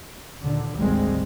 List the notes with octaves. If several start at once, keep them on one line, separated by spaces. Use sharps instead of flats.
D#2 A#2 D3
G#1 D2 C3 G3 G#3 C4